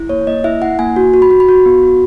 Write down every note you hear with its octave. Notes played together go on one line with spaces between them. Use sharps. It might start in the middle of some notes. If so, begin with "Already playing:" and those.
Already playing: E4
A#3 C#5
A#3 D#5
E4 E5
E4 F#5
A#3 G#5
F#4
F#4
B5
F#4
B5
F#4
B3
F#4